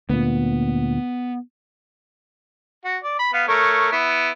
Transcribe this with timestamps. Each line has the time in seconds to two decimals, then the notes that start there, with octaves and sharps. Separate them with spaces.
0.10 D2 A#2 B3
2.85 F#4
3.04 D5
3.19 B5
3.33 B3 F5
3.48 A3 A#4 C#5
3.92 B3 E4